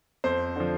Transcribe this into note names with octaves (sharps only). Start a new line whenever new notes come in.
F2 C5
D3 F3